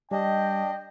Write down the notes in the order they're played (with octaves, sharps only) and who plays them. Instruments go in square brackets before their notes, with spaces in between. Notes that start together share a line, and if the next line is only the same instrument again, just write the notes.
[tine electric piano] G3 [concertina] D4 [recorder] D#5 [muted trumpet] G5